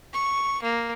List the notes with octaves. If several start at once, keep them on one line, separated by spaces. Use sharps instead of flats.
C#6
A#3